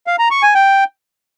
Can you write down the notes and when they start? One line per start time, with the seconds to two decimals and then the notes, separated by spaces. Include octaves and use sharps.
0.07 F5
0.19 A#5
0.31 C#6
0.43 G#5
0.55 G5